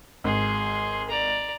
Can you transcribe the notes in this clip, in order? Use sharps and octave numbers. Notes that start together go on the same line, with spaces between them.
G#1 G#4 C6
D5 A#5